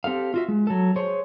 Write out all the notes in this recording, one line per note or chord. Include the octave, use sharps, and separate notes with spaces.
C4 G4 A4 F5
F4 F#4 E5
G#3
F#3 A4
G#4 C5 C#5